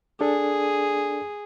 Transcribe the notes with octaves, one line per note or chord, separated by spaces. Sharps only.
D4 G#4 A4 D5